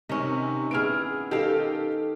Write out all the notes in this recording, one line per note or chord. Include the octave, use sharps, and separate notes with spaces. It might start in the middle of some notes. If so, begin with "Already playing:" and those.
C3 D#3 C#4
B3 E4 G#4 F6 D7
D#3 G4 A4 F5